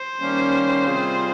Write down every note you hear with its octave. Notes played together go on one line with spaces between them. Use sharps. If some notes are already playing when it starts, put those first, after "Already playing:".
Already playing: C5
D#3 G3 A#3 C#4
C3 G3 C4 F4 G#4